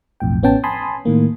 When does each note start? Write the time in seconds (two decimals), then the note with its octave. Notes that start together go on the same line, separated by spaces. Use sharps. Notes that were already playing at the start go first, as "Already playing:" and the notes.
0.20 B1 F2 A2 G5
0.43 A1 B3 C#4 G5 A5
0.64 G#5 A5 B5 C6 D#6
1.05 A2 D#3 A#3